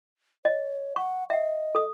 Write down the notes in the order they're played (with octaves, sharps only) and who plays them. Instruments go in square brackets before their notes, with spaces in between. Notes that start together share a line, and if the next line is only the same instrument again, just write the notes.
[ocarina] C#5 [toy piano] D#5
[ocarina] F#5 [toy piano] C#6
[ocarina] D#5 [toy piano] E5 F#5
[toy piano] A4 D#6